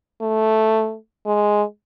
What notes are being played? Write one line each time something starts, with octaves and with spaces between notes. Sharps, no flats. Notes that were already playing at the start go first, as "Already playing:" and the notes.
A3
G#3